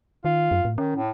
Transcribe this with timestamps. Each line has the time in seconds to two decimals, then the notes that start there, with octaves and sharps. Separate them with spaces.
0.25 D#3 F4
0.51 F#2
0.65 A2
0.78 D#3 C#4
0.96 A2